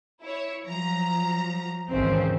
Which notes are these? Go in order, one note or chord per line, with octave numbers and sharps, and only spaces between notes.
E4 C#5
F3 F#3 A#5
G#1 D#2 C#3 E3 C4